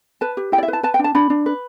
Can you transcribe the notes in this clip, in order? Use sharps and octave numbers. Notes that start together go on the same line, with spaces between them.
B4 A5
G4
E4 G5
D5
E5
B4 A5
B4 A5
G5
D4
A5
D4 B5
D4
B4